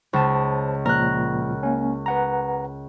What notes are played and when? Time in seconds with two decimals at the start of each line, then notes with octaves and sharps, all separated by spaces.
0.13 C#2 C5 A5
0.86 A#2 F3 A#4 F#6
1.63 A#3 C#4
2.06 B4 F#5 A#5